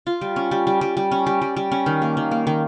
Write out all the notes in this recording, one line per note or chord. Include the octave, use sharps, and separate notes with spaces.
F4
G3
C#4
G3
G3
G3
G3
C#4
G3
G3
G3
C#4
D#3
A#3
D#3
A#3
D#3